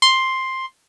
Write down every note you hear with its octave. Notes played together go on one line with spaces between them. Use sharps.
C6